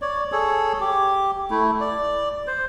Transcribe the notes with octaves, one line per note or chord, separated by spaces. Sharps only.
C#5 D5
G#4 A4 C#5
G4
A3 E4
D5
C5